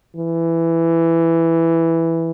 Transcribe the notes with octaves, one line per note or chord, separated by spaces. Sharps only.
E3